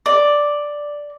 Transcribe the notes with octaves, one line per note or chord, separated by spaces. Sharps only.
D5